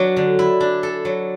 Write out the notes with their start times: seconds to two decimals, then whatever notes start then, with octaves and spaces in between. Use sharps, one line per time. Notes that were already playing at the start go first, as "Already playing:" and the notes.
Already playing: F#3 D4
0.17 D3
0.39 E4
0.61 D4
0.83 A4
1.05 F#3